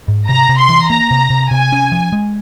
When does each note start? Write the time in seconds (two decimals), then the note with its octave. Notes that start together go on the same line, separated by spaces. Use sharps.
0.08 G#2
0.28 C3 A#5
0.49 C3
0.59 C6
0.69 E3
0.90 A#3 A#5
1.11 C3
1.30 C3
1.51 C3 G#5
1.72 C#4
1.92 F3
2.13 G#3